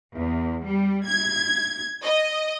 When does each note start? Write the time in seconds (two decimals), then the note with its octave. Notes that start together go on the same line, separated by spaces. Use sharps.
0.14 E2
0.65 G3
1.06 G#6
2.04 D#5